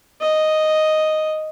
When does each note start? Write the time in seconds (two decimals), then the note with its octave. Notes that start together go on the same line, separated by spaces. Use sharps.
0.21 D#5